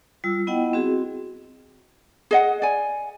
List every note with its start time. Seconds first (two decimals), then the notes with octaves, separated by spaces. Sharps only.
0.24 G3 F4 E6
0.47 B3 E4 D#5 F#5 G5
0.73 C4 F#4 G#4
2.31 G#4 D#5 F#5
2.62 D5 G#5